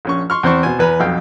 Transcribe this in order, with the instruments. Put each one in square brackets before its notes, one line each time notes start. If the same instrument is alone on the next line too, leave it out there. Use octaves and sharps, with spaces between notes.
[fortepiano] A#1 C#4 C#6
C6 C#6 F6
E2 C4 C5 C6 C#6
B2 C5 G#5
E2 B4 G#5 A#5
B1 F2 F5 G5